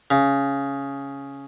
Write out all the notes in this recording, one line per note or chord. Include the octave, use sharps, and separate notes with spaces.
C#3